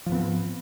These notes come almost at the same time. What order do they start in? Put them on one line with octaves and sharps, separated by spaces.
F3 G#2 B3 C4